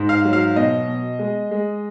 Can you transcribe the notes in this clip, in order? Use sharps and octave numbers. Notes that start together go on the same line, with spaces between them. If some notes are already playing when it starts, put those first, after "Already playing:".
Already playing: G#2
F5
F#3
F5
B2 D#5
B2
G#3
G#3